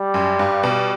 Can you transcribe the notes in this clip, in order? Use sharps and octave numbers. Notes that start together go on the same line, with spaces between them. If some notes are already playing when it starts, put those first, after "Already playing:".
Already playing: G3
F#2
G2
B2